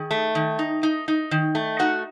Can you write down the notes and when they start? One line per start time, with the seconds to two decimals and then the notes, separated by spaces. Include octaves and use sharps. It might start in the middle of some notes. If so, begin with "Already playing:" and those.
Already playing: D#3 G#4
0.11 A3
0.35 D#3
0.59 D#4
0.83 D#4
1.08 D#4
1.31 D#3
1.55 A3
1.79 D#4 F#4 F#5